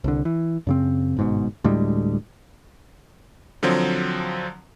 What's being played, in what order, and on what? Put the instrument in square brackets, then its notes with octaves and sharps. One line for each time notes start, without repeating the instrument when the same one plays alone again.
[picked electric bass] C2 D3
E3
F#2 C#3 C4
G1 G#2 B2
D2 A2 G3 G#3
[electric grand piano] D3 F3 F#3 C4